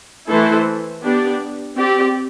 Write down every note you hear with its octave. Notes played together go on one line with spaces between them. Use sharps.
E3 A3 E4 A4 C5
B3 D4 G4 D5
C4 G4 D5